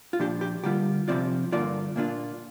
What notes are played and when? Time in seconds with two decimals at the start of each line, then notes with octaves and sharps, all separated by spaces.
0.13 F4
0.19 A#2 F3 D4 G4
0.41 G4
0.64 D3 G3 A#3 F4 G4
1.08 C3 F3 C4 F4 D5
1.52 G2 D3 A#3 F4 D5
1.96 A#2 A#3 D4 F4